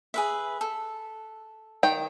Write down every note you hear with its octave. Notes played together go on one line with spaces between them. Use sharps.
G#4 B4 E5
A4
D#3 G5